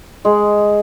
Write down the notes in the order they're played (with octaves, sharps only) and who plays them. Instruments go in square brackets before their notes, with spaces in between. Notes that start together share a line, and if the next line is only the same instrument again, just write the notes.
[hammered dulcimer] G#3